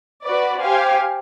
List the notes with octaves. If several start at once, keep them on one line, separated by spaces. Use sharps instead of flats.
F#4 B4 D5
G4 C5 F5 G#5